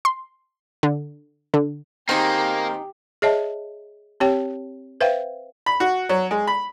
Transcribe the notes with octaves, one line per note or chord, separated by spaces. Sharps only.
C6
D3
D3
D#3 A#3 C4 D#4 G4 G#4
G#4 C#5 D#5 E5 A5
C4 G4 C#5 G5
B4 C5 E5 F5 G5
B5
F#4
F#3
G#3
B5